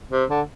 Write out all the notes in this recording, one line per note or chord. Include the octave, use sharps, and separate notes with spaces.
C3
D3